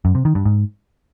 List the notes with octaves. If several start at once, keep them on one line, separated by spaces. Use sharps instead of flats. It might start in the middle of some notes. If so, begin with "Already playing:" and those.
F#2
C3
D#3
G2
G#2